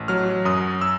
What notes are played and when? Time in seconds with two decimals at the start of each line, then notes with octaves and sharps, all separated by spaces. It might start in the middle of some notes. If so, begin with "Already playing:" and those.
Already playing: A1
0.08 F#3 F6
0.45 F#2 D#6
0.81 E6